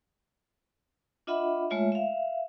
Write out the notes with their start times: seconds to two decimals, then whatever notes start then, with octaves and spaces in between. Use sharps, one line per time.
1.27 D4 F4 D#5 E5 F#5 B5
1.70 G#3 A3 F4 C#5 E5
1.92 E5 F5